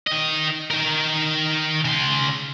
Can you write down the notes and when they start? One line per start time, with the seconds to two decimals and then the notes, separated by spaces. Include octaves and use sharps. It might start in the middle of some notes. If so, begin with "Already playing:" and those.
0.07 D#3 D#5
0.71 D#3 A#4
1.85 C#3 C6